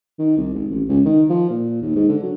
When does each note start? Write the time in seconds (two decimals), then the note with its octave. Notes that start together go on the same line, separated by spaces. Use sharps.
0.19 D#3
0.37 C2
0.54 G#1
0.70 A1
0.89 C#2
1.05 D#3
1.30 F3
1.50 A#2
1.82 D#2
1.96 G#2
2.09 D3
2.23 F#3